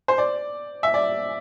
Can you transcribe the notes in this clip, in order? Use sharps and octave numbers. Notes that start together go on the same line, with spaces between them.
C5
D5
E5
D5